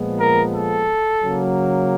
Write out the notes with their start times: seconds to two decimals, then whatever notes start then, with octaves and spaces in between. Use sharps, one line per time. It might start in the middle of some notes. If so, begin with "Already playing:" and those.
Already playing: A#2 F3 G#3 B3
0.20 A#4
0.54 A4
1.22 C#3 F#3 A#3